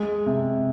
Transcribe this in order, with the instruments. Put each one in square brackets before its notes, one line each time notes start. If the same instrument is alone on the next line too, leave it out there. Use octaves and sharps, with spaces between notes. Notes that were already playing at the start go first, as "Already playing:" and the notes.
Already playing: [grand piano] G#3
C3